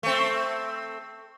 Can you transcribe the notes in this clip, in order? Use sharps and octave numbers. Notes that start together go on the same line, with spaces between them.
A3 C4